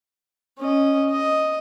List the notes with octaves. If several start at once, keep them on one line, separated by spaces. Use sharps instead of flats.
C#4 D#5
D#5